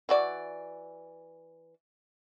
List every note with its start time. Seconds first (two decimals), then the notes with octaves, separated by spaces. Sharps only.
0.09 E3 F#4 D5